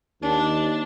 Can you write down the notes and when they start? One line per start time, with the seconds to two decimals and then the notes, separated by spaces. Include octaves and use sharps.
0.22 D#2 D4